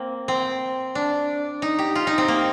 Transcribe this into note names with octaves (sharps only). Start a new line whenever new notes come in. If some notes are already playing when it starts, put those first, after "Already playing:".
Already playing: A#3 C4
C4
D4
D#4
G4
F4
D#4
C4
A#3